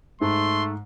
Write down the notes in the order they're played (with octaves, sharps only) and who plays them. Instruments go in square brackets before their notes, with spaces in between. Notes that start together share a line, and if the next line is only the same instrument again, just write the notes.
[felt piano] G#2 [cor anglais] A3 [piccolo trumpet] C6